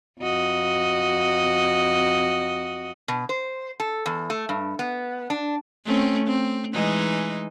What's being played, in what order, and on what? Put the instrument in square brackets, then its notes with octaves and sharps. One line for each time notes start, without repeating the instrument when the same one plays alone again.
[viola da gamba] F2 F#4 D#5
[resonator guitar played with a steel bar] B2
C5
A4
E2
A3
G2
B3
D4
[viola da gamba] A3 C4 C#4
C4
E3 G#3 D#4